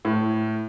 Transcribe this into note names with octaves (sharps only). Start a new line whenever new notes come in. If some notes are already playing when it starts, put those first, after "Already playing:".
A2